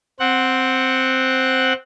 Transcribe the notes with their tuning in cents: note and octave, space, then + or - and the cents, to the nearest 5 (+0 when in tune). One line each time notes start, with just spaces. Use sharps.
C4 +0 F#5 +0